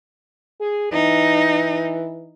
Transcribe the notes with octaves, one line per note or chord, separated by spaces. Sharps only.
G#4
E3 D#4